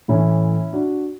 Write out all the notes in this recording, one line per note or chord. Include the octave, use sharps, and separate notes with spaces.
A2 E3 C#4 E4
D4 F#4